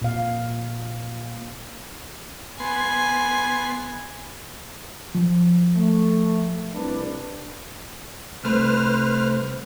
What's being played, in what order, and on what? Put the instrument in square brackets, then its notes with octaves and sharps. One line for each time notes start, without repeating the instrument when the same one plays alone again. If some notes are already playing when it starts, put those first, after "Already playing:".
[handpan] A#2 F5
[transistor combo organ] B3 C6 [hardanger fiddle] G#5
[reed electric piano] F3
[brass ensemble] A3
C2 D4 B4
[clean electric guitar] C2 A3 [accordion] B4 C5 F6